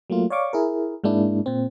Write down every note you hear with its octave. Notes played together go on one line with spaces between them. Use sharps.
F#3 A3 A#3 F4
C#5 D5 F5 C#6 D6
E4 G#4 A#4
G#2 G#3 A#3 D4 E4
A#2 C4